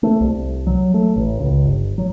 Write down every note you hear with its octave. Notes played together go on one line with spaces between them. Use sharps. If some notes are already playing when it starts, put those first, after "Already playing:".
A3
C2
F#3
A3
A1
C#2
G1
F#3